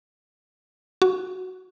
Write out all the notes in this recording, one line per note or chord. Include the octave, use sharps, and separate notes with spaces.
F#4